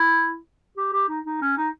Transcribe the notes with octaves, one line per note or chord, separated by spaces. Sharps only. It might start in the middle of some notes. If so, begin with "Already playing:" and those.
Already playing: E4
G4
G4
D#4
D#4
C#4
D#4